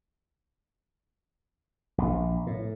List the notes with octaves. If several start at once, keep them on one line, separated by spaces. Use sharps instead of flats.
A#1
A2